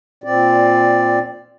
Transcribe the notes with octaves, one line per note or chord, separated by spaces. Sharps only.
A#2 C4 D5